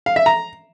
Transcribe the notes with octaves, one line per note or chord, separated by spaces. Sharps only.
F5
E5
A#5